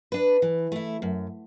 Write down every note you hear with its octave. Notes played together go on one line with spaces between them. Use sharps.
D4 B4
E3
A3 E4
F#2